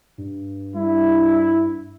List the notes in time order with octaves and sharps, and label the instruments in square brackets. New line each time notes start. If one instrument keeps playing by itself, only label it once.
[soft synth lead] G2
[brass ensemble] G3 D4 E4